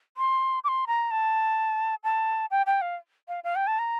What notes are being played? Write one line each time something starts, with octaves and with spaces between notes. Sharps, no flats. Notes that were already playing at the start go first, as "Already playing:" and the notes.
C6
D6
C6
A#5
A5
A5
G5
G5
F5
F5
F5
G5
A5
A#5